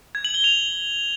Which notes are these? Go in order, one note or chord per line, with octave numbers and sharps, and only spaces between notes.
G#6
F#7
G7
F7